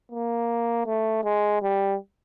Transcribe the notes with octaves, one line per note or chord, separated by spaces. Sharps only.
A#3
A3
G#3
G3